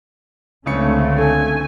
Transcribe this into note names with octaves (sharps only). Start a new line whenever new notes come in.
C#2 D3 A3 C4 C#4 C#7
A4 G#5 C#6